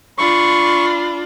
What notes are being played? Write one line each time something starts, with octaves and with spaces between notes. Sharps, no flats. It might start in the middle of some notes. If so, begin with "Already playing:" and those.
D4 F4 B5 C#6